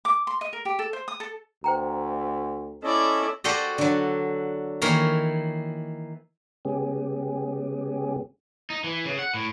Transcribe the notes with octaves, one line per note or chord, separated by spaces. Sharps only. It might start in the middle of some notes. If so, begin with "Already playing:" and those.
D6
C6
D#5
A#4
G4
A4
C5
D#6
A4
D2 C5 G5 A#5
C#4 E4 A4 D5 D#5
F#4 G4 A4 C5 D5 D#5
D3 F#3
D#3 E3 A#3 A#4 C#5 A#5
C#3 G#3 B3 C#4 G4 G#4
D#4
E3
C#3
F#5
A2